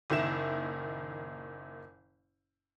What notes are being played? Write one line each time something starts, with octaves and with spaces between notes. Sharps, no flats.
F#1 A#2 D#3 E4 E7